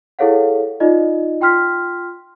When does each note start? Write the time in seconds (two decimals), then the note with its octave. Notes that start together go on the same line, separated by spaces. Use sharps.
0.19 E4 G#4 A4 C#5 F5 F#5
0.80 D#4 F4 D5 D#5
1.41 F4 G5 C6 F6 B6